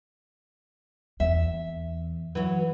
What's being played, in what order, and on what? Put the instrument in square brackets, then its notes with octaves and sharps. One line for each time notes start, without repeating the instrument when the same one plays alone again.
[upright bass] E2 [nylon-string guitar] E5
[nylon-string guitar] E3 F#3